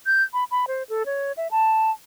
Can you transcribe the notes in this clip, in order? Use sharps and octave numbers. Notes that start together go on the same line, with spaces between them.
G6
B5
B5
C5
A4
C#5
E5
A5